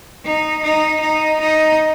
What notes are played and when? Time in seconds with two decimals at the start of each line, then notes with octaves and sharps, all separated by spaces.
0.25 D#4
0.63 D#4
1.01 D#4
1.40 D#4